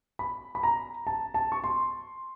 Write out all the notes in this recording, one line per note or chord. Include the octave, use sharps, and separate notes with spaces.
B5
B5
A#5
A5
A5
C#6
C6